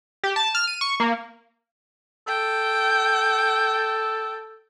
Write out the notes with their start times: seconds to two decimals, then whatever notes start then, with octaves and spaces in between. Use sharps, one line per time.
0.24 G4
0.36 A5
0.55 F6
0.67 D#7
0.81 C#6
1.00 A#3
2.28 A4 G5